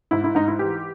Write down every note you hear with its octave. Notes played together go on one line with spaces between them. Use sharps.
G#2 E4
E4
G#2 D#4
E4
E3 G4